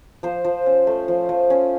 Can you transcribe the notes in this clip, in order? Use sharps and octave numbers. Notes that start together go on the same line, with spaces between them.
F3 C5
F3
C#4
A3
F3
F3
C#4